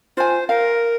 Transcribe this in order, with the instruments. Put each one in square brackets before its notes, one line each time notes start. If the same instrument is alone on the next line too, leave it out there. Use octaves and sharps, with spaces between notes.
[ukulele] F4 G#5 [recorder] C5
[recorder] A#4 [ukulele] F5